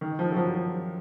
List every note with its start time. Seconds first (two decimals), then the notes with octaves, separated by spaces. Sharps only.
0.01 D#3
0.19 F3
0.32 F#3
0.36 F3
0.54 F3